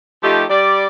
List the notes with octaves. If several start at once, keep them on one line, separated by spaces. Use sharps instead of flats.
F3 A3 D#4 G4
G3 D5